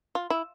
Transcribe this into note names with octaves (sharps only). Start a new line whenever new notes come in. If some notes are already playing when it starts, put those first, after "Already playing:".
F4
E4